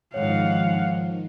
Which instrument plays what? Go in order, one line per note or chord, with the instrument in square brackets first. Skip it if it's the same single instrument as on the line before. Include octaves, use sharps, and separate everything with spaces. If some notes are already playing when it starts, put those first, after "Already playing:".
[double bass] G#2 [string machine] D#3 F3 [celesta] C#5 [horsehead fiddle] F5 F#5